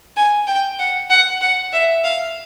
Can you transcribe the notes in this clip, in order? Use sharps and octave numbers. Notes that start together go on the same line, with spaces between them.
G#5
G5
F#5
F#5
F#5
E5
F5